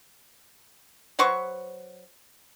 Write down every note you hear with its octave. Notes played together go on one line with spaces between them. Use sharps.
F#3 B4 C5 C#6